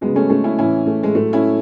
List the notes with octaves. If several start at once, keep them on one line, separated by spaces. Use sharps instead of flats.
C#3 F#3 G#3 B3
A3 C#4
A3 C#4
C#4 E4
A2 E3 C#4 E4
A3
G#3
A2 F#3 A3
C#4 E4